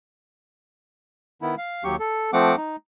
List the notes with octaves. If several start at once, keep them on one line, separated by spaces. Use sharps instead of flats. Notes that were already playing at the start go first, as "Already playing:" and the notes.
D#3 B3 E4
F5
D#2 F#3 G4 C#6
A4
F3 A3 C4 F#5 D6
D#4